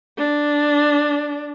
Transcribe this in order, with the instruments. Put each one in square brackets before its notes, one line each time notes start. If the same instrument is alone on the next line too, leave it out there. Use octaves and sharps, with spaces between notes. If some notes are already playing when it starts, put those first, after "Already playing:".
[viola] D4